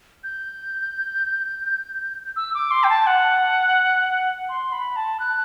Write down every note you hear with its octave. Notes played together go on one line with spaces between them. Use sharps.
G6
E6
D6
C6
G5
A5
F#5
C6
B5
A5
F#6